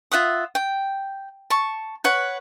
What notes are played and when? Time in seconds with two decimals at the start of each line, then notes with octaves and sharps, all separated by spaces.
0.12 F4 E5 F#5 D#6
0.55 G5
1.50 A5 C#6
2.04 B4 C#5 F#5